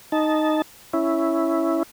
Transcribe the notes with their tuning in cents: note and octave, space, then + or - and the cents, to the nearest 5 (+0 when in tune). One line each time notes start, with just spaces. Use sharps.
D#4 -5 A5 -15
C#4 +0 E4 +0